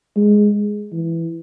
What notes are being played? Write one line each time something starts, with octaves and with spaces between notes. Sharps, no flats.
G#3
E3